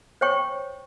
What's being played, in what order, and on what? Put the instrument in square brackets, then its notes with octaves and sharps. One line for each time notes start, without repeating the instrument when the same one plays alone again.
[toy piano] C5 C#5 G5 C#6